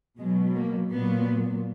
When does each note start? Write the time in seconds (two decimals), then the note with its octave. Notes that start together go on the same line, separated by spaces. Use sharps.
0.19 B2 F#3 G#3
0.55 A#3
0.92 A#2 F#3 B3